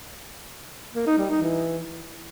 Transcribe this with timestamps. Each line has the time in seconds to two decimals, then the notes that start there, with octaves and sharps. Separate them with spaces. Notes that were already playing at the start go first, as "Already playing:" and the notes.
0.95 A#3
1.07 D#4
1.19 G3
1.30 D#4
1.42 E3